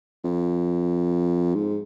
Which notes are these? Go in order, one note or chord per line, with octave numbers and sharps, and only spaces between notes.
F2
G#2